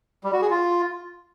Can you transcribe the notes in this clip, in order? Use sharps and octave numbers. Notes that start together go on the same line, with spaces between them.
G3
F#4
G#4
F4